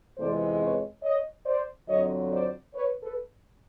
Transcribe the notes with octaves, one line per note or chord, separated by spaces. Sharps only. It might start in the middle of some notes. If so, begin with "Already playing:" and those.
F2 C3 E3 G#3 B3 C5 D5
B4 C#5
C#5 D#5
C5 D5
F2 D3 F#3 C#5 D#5
C5 D5
B4 C#5
A4 B4